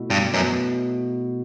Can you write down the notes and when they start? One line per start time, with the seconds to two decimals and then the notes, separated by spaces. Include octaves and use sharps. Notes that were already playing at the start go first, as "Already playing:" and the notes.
Already playing: B2 A3 E4
0.10 G2
0.34 F#2 B2